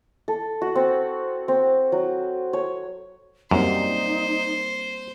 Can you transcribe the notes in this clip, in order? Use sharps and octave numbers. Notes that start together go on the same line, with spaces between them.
A4
F#4
C4
C4
F#3
C#5
F#2 G3 A#3 C4 D#4 C5